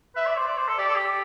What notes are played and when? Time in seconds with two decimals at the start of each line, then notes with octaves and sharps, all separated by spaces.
0.15 B4 E5
0.26 D5
0.37 C5
0.47 D5
0.58 C5
0.68 A4
0.78 G4 D5
0.88 A4
0.95 G4